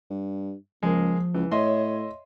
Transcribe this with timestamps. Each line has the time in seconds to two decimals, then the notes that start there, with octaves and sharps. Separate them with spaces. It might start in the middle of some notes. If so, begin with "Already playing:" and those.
0.10 G2
0.83 C#2 F3 G#3 A#3
1.34 C#2 E3
1.51 A2 C#5 D#5 E5 C6